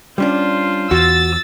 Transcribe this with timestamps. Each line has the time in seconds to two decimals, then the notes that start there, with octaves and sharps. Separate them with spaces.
0.18 G3 C#4 D4 F4 C5
0.91 E2 F#4 E6 A6